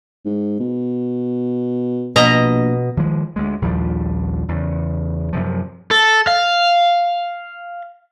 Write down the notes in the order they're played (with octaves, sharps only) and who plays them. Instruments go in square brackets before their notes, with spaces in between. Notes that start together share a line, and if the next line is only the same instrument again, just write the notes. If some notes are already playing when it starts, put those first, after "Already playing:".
[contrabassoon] G#2
B2
[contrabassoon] A#1 [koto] B2 D#5 A#5
[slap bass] D#3 F3 G#3
D2 G#3
A#1 D#2 F3 G3
E2 C#3
F#2 C3 F3
[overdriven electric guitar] A4
F5